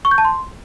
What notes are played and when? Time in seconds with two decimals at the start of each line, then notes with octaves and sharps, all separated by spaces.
0.05 C#6
0.11 G6
0.18 A5
0.25 C6